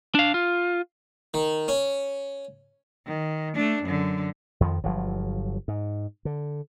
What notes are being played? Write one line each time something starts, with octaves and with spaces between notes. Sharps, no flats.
D4 F5
F4
D#3
C#4
D#3
A3 D4
F#2 D3
F2 D#3 F3
G1 F3 F#3
G#2
D3